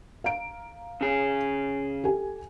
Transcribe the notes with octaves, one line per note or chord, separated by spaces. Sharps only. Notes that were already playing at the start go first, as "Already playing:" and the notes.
F5 A#5 D7
C#3 G#4
G4 A4 G#5